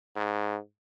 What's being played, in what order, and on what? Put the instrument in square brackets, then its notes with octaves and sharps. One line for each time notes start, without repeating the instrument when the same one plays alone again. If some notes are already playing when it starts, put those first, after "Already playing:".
[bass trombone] G#2